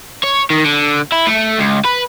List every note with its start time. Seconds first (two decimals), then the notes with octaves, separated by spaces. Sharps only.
0.24 C#5
0.50 D#3
0.65 D3
1.12 E4
1.27 A3
1.59 C#2
1.85 B4